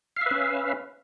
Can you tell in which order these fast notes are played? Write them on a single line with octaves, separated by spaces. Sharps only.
F5 E5 B4 C#4